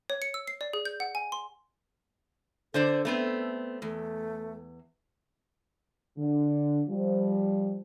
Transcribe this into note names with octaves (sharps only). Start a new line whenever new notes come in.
C#5
C#7
E6
C7
D5
G#4
G6
F#5
G#5
C6
D3 A4 C5 D5
A3 B3 C4
E2 A3
D3
F3 G3